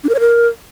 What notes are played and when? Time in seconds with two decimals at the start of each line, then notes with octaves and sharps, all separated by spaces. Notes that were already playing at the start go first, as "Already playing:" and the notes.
0.04 D4
0.09 A#4
0.14 C#5
0.20 A#4